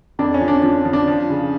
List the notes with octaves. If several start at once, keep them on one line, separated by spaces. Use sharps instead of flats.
F2 D4
C#4
F3
D4
F3 D4
F3
D4
F3
C#3